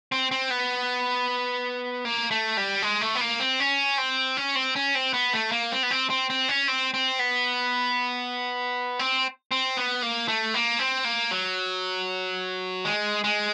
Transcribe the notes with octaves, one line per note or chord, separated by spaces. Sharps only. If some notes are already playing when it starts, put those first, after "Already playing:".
C4
C4
B3
A#3
A3
G3
G#3
A3
B3
A#3
C4
C#4
C4
C#4
C4
C#4
C4
B3
A3
A#3
C4
B3
C4
C4
C4
C#4
C4
C4
B3
C4
C4
B3
A#3
A3
A#3
C4
A#3
F#3
G#3
G#3